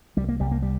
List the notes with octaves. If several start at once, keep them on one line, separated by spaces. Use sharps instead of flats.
C2 G3
A#3
C2 G3
A#3
G3